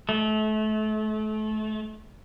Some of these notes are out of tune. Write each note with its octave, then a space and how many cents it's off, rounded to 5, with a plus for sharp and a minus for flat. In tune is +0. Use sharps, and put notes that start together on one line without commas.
A3 -30